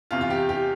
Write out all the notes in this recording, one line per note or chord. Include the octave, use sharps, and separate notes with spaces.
E2 C3 E3 F4
F4
G4
G4